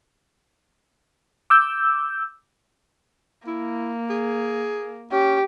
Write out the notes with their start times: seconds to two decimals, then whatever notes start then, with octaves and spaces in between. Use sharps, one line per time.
1.50 D6 E6 G6
3.47 A#3 E4
4.10 G#4
5.12 C#4 G4